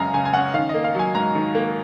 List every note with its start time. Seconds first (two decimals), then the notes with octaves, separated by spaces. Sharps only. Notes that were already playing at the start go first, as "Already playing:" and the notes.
Already playing: F#2 C#3 G#3 D#5 F5 G#5 A#5
0.14 C#3 G#5
0.25 G#5
0.33 C#4 F#5
0.54 D#3 F5
0.69 A#3 D#5
0.84 F5
0.95 F#3 G#5
1.15 G#2 A#5
1.35 D#3
1.55 A#3